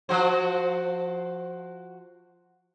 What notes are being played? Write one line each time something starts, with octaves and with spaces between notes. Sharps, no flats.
F3 F#4 C5